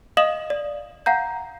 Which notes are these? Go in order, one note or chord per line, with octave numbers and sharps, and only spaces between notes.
D#5 F5 D#6 E7 F#7
D5
F5 F#5 A#5 G6